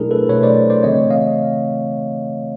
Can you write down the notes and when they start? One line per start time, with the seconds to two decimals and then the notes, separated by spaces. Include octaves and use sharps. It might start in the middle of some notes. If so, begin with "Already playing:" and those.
Already playing: B2 F#3 A3 D4 E4 G#4 A#4
0.11 A4 B4
0.29 B2 F#3 A3 B4 C#5
0.43 C5 D5
0.70 C5 D5
0.83 C#3 E3 A3 C4 C#5 D#5
1.10 D#5 F5